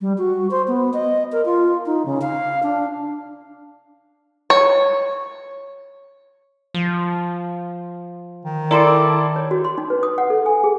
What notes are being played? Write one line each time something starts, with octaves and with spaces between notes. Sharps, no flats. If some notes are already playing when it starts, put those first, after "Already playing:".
G3
F#4
C5
B3
D#5
A#4
F4
D#4
C#3
F5
D4
C#5
F3
D#3
E4 A4 A#4 D5 C6 D6
C#5
F#4
C6
D#4
B4
D#6
F#5
A4
G#5
G#4